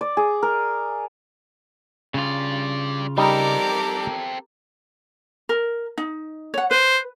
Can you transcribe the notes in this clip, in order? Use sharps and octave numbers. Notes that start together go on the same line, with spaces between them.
D5
G#4
A#4
G2 C#3 F4 D5
G3 C4 D#4 G4 A4 A#4 D5
A#4
D#4
C#5 F#5
B4 C5